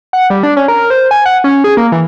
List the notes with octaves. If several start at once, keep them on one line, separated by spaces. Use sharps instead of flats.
F#5
G3
D4
C#4
A#4
C5
G#5
F#5
C#4
G#4
A#3
E3